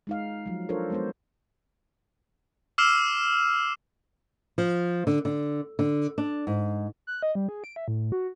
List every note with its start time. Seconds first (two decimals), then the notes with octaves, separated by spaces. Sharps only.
0.07 G#3 D#4 F5
0.46 F3 F#3
0.69 D4 F4 A4 A#4 C5 C#5
0.90 G#3 B3 C5
2.78 D6 E6 F6 C7 E7
4.58 F3
5.07 D3
5.25 D3
5.79 D3
6.18 D4
6.47 G#2
7.07 F#6
7.23 D#5
7.35 G3
7.49 G#4
7.64 D7
7.76 E5
7.88 A2
8.12 F#4